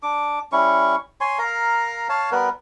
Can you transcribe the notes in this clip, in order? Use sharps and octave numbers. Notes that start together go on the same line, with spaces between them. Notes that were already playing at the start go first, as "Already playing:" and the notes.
D4 D6
G3 C#4 E4 C#6
C#5 G#5 C6
A#4 F5 A#5
C#5 F5 A5
G3 B3 A#4 B4